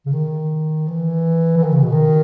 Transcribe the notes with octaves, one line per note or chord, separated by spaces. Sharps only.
C#3
D#3
E3
E3
D#3
C#3
B2
D#3